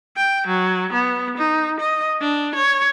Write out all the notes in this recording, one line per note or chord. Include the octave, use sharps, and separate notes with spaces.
G5
F#3
B3
D#4
D#5
D4
C#5